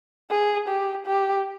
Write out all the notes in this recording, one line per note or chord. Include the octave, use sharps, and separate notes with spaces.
G#4
G4
G4